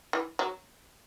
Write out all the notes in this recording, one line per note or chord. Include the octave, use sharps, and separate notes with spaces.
E3
F#3